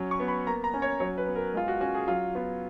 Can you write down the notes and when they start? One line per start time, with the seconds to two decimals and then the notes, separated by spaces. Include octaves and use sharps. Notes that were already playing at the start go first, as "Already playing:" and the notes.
Already playing: F#3 C#4
0.11 C#6
0.20 B3
0.28 B5
0.47 A#3 A#5
0.64 A#5
0.74 C#4
0.82 C#5
1.00 F#3 C#5
1.18 B4
1.27 B3
1.36 A#4
1.54 G#3 F4
1.68 F#4
1.80 C#4 F#4
1.95 G#4
2.08 F#3 F4
2.35 B3 F4